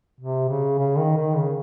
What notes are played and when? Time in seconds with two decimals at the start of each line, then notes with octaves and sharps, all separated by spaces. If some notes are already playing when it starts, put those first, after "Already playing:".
0.21 C3
0.49 C#3
0.78 C#3
0.98 D#3
1.17 D#3
1.36 C#3